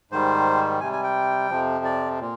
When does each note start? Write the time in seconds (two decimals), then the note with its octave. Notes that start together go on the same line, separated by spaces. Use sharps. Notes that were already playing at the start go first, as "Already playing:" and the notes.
0.11 G#2 D#3 G3 C5
0.81 C3 G3 G#5
0.93 G#5
1.03 G5
1.50 F2 C3 F3
1.85 D5
2.20 A#2